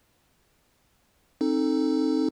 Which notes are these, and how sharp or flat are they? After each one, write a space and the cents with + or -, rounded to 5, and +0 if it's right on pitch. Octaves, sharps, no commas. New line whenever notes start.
C4 +30 D#4 +0 A4 +0